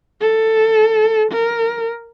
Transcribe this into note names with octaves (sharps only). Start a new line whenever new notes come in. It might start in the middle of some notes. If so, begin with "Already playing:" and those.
A4
A#4